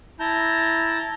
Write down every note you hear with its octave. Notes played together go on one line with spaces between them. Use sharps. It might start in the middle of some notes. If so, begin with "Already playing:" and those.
E4 A5 A#5 G6